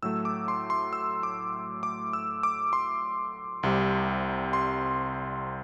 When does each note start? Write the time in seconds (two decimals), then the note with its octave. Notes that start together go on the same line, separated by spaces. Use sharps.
0.03 A2 F#3 A3 E6
0.25 D6
0.48 C6
0.70 C6
0.93 E6
1.23 D6
1.83 D6
2.13 E6
2.43 D6
2.73 C6
3.63 C2 C3 G3
4.53 C6